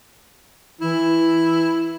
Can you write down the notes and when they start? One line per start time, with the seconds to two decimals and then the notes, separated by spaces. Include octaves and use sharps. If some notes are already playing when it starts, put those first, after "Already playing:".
0.81 E3 E4